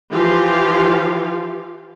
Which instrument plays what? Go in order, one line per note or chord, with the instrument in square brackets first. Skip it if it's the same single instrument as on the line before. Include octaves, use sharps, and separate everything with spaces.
[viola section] E3 F3 F4 G4 F5